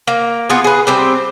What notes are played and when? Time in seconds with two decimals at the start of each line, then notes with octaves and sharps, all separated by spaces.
0.07 A#3
0.49 B3 F4 G#4
0.64 G#4 B4
0.87 G3 C4 C5